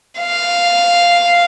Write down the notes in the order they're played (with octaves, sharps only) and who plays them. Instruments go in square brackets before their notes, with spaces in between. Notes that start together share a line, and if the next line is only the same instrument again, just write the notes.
[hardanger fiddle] F5